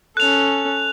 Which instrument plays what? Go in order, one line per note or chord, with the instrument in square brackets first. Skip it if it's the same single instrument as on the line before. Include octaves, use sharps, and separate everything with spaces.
[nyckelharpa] C#4 A4 [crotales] F#6 F7